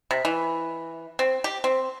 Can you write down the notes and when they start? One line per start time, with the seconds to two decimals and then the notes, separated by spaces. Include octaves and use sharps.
0.11 C3
0.25 E3
1.19 C4
1.44 G4
1.64 C4